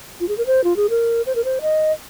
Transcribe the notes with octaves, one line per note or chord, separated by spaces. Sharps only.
F4
G#4
A#4
C5
F4
G#4
A#4
C5
A#4
C5
D#5